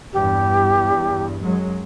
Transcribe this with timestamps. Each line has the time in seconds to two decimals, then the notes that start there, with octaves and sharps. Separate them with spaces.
0.13 E2 G2 G4
1.43 F#2 F#3 G#3